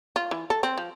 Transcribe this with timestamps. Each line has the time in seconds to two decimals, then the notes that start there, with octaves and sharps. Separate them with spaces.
0.16 F4
0.31 E3
0.50 A4
0.63 C4
0.78 F3